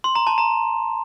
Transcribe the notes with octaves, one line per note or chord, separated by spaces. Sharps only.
C6
A#5
A5
A#5